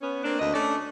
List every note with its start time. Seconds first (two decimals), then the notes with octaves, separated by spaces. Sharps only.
0.01 B3 C#4
0.23 A#3 C4 D4
0.39 D2 A#3 D#5
0.53 A3 C#4 D4 D5